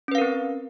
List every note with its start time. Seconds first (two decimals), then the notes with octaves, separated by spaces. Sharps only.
0.08 C#4
0.12 B4
0.15 F5
0.18 A#4
0.22 C4